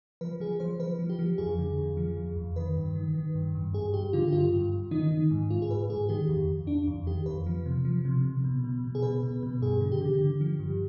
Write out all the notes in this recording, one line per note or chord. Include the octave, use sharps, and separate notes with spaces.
F3 B4
F3 G#4
F3 C5
F3 B4
F3
G4
F3
F2 G#4
D3
F2
F3
F2
F2
D#3 B4
G2
D#3
D#3
G2
G2
G2 G#4
G2 G4
D3 F4
G4
G2 F4
G2
G2
D#3 D#4
D#3
G#2
G#2 F4
G#4
G#2 B4
G#2 G#4
D#3 G4
F2
F2
F2 D4
F2
D#3 G4
F2 B4
F3
C3
F3
C3
C3
B2
B2
B2
G#4
B2 B4
B2
B2
G2 G#4
D3
G4
D3
D3
F3
G2